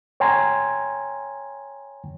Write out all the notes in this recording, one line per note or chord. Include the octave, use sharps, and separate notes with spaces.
C#5 G5 G#5 A#5 C6 G#6